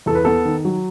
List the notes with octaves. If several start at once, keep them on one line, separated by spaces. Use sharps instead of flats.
E2 A4
B4
B3 A4
D#3
F#3